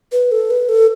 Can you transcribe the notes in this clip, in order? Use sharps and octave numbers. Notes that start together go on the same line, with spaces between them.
B4
A4
B4
A4